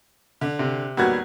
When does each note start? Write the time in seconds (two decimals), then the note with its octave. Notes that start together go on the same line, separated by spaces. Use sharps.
0.41 D3
0.59 C3
0.97 D#2 F#3 G3 B3 F#4 G#6